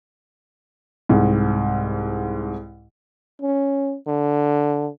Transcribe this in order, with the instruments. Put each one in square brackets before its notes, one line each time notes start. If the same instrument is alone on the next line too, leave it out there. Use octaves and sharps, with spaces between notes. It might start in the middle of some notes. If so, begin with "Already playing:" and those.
[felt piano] C2 G#2
[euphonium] C#4
D3